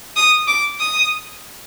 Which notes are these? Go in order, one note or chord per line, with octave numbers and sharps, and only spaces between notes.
D#6
D6
D#6